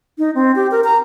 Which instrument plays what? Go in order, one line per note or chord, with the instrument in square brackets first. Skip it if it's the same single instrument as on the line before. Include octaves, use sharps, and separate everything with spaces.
[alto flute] D#4
C4
G4
A#4
A#5